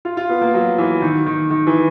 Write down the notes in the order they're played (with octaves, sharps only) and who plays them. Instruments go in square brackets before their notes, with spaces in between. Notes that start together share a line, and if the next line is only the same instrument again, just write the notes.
[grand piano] F4
F4
B3
A#3
F#3
E3
D#3
D#3
D#3
E3